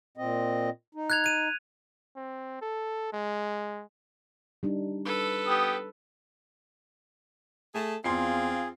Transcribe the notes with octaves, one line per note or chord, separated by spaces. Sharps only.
A#2 C4 D#5
D#4
F#6 G#6 F7
G#6 D#7
C4
A4
G#3
G3 D4 D#4
A4 B4
B3 G4 D#6
A3 G#4 A4
E2 C4 F4 G#4 C6 C7